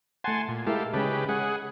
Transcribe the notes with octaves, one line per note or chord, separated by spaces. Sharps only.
A3 F#5 G#5 A5 C6
A#2
G#3 E4 G4 A4 A#4 F5
C#3 G#3 C#4 G4 B4 A5
G#3 G#4 C#5 F#5 B5